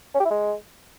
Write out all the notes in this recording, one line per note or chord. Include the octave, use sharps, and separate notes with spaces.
C#4
G4
E4
G#3